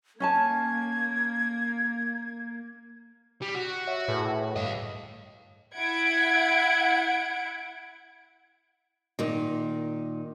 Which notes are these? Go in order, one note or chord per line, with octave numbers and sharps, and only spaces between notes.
A#3 C#4 G#5 A5 G#6
G3
F#4
C#5 E5 F#5
A2 G#4 B4
G2 D#5 F5
E4 F#5 G#6 D7
A#2 D#3